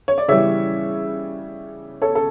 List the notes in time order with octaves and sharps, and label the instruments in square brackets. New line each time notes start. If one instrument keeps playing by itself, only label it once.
[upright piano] C#5
D5
C#3 E3 G3 C#5 E5
A4 C#5
A4